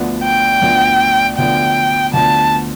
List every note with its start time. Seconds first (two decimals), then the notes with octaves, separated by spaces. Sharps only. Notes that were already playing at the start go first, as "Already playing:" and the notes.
Already playing: D2 D3 F3 B3 D4
0.24 G5
0.62 D2 D3 F3 B3 D4
1.38 D2 D3 F3 B3 D4 G5
2.13 D2 D3 F3 B3 D4 A5